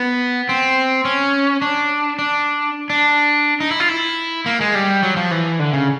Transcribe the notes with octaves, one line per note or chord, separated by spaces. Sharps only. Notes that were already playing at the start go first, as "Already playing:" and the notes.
Already playing: B3
C4
C#4
D4
D4
D4
D#4
E4
F4
E4
A#3
G#3
G3
F#3
F3
E3
D3
C#3